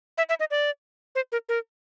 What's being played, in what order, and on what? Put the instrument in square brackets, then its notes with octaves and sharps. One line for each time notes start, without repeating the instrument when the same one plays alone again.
[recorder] E5
E5
D#5
D5
C5
A#4
A#4